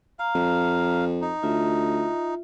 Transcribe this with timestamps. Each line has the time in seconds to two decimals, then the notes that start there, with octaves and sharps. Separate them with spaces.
0.19 F5 A#5
0.35 F2
1.22 D#4
1.43 D2 F4 E5